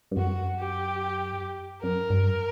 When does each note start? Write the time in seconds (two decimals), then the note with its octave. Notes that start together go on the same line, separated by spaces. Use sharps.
0.11 G2
0.17 F#2 F#4
0.58 G4
1.82 F#2 A#4
2.10 G2